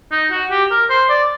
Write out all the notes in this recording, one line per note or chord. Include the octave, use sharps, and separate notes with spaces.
D#4
F#4
G4
A#4
C5
D5